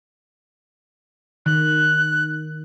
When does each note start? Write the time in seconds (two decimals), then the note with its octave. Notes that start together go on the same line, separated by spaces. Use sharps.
1.46 D#3 F#6